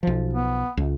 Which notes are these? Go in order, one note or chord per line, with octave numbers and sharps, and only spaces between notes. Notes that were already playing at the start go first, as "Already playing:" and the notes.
B1 F3
B3
C#2